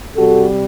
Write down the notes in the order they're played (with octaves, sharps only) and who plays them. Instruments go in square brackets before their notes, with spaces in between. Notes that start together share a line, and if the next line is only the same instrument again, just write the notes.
[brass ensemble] C3 G3 F#4 A4